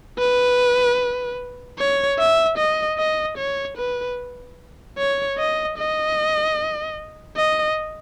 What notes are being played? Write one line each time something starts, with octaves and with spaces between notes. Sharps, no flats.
B4
C#5
E5
D#5
D#5
C#5
B4
C#5
D#5
D#5
D#5